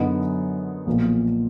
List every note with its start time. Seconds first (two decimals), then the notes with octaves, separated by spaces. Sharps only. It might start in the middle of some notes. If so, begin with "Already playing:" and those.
Already playing: F#2 D3 F#3 B3 D#4
0.86 B1 A#2 F3